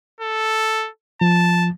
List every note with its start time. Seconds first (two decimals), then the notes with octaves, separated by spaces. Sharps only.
0.21 A4
1.21 F3 A5